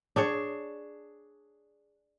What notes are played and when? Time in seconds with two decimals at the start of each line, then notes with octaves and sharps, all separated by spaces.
0.16 D4 G#4 C#5